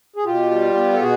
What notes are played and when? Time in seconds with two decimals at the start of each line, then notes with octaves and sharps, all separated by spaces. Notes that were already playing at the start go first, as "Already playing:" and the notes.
0.16 G#4
0.24 B2 F4 G4
0.51 G3
0.75 B3
0.93 A4
1.00 B2 F#4 G#4